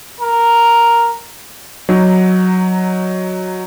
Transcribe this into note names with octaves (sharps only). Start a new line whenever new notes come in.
A#4
F#3 D#4